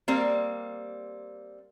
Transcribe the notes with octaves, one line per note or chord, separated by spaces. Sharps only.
G3 A#3 C4